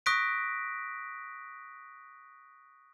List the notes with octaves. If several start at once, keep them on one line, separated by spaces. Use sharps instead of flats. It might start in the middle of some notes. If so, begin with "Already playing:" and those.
C#6 D#6 F#6 A#6 B6 D7